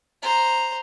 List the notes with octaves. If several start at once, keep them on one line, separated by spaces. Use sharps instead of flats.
C5 A#5